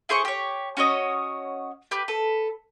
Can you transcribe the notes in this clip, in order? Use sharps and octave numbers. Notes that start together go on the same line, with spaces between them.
E4 G#4 C5 C#6
G4 C#5
C#4 F#4 C#5 D#5
G4 B4
A4 B4